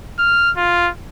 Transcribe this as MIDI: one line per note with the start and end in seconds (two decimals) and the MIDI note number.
0.19 0.51 89
0.57 0.89 65